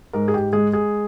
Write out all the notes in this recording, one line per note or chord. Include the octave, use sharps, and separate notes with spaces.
G#2 A#4
G#4
G4
G#3 G#4
G#4